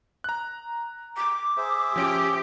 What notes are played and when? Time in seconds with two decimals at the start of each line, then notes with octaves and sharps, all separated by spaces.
0.24 A#5 F#6
1.17 D6
1.57 G#4 C5 E5
1.96 F3 C#4 G4 D7